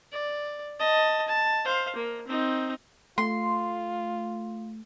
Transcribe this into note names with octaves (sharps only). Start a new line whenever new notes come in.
D5
D#5 A5
A5
C5 F5
A#3
C4 D#4
A3 F4 C6